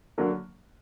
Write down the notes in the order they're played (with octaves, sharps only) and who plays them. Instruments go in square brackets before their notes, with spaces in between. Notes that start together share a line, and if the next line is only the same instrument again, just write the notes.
[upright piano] D3 F#3 A#3